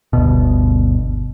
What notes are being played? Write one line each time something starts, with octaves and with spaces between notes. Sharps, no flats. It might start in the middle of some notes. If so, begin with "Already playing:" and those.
G1 D2 B2